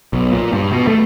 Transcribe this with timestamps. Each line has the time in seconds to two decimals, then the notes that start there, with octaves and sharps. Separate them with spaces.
0.13 B1
0.32 A#2
0.53 G2
0.72 B2
0.87 A3